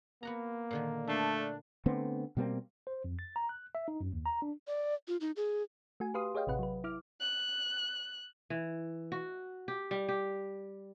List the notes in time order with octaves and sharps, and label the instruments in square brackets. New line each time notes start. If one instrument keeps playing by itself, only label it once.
[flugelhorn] A#3 [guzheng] B3 F#4 A#5
[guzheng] A#2 D3 D#3
[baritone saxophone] A3 [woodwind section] D4 [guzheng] E5 F5
[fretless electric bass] D3 A3 B3 C4
B2 G3 A#3 C4
[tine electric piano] C5
F2
A6
A#5
F#6
E5
D#4
F#2
D#2
A#5
D4
[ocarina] D5
F4
D#4
G#4
[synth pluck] A3 F#4 G#5
G4 B4 F5 C6 D#6
G#4 C#5 D#5 F5 G5
A1 C3 B4 F#5
F#3 B4
E4 D6 F6
[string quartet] F#6
[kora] E3
F#4
G4
G3
G4